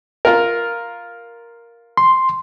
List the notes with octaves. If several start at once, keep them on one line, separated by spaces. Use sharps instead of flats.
F4 A#4
C6